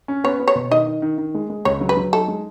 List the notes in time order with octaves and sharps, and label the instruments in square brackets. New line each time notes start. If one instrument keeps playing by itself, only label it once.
[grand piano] C#4
[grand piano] B3 [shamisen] C#5
[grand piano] B3
[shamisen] C#5
[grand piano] B2
[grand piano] D#3 [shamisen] D#5
[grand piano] D#3
D#3
D#3
G#3
G#3
[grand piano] C#2 [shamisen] C#5
[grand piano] F#3
[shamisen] B4
[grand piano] F#3
[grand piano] D#4 [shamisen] A4
[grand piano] G#3